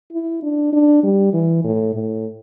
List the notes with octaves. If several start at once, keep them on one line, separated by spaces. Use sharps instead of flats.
E4
D4
D4
G3
E3
A2
A2